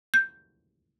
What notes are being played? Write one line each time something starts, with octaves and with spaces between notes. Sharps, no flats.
G6